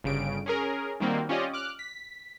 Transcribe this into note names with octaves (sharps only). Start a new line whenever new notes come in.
G1 C#3 G3 D7
C#4 G#4 A#4
D#3 G3 A#3 C4 F#4
C#4 F4 G4 D5 D#5
D6 F6 F#6
B6